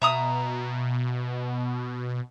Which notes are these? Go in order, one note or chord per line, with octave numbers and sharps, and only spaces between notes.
B2 E5 A#5 D#6